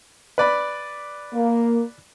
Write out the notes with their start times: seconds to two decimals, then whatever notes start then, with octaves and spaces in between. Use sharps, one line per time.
0.38 B4 D5 B5
1.34 A#3